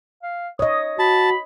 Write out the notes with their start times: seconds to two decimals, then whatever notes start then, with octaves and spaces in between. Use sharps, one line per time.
0.23 F5
0.59 C#5 D#5 D#6
0.99 F#4 A5 B5